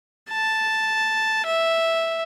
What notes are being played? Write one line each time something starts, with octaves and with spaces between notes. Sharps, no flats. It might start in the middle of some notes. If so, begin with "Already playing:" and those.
A5
E5